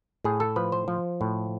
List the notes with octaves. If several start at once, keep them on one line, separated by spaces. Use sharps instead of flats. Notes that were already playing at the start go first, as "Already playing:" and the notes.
A2 G#4
A4
F3 B4
C5
F3
A2